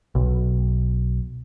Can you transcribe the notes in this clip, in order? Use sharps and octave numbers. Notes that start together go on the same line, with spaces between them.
B1